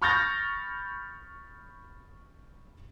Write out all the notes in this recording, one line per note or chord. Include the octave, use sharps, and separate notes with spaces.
B5 C#6 F6 G6 A6 A#6